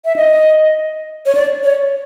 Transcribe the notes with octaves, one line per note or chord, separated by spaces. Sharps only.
E5
D#5
C#5
D5
C#5